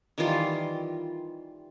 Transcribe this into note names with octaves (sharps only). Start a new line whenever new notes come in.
D#3 E3 G3 F4